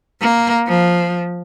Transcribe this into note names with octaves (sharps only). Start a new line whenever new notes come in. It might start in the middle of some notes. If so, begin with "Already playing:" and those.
A#3
F3